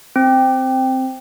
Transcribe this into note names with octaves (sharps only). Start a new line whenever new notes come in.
C4